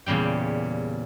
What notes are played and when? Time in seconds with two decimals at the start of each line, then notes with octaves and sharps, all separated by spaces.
0.06 E2 A#2 C#3 G3 G5